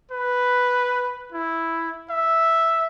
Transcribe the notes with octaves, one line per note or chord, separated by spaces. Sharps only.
B4
E4
E5